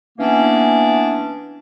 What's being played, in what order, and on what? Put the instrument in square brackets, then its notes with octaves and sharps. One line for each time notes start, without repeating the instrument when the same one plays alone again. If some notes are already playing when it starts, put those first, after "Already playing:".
[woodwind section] E3 A#3 B3 C#4 D4